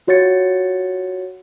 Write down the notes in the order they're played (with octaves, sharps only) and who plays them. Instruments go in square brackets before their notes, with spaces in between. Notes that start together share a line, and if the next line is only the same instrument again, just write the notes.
[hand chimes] F4 F#4 C#5 G#6 A6 C#7